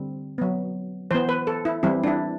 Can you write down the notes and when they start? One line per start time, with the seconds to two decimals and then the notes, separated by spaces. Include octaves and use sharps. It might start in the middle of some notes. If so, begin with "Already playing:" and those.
Already playing: D3 G3 C4
0.38 F#3 B3
1.11 E3 B3 C5
1.29 B4
1.47 A4
1.65 E4
1.83 E3 G3 C4 E4
2.04 D4
2.07 E4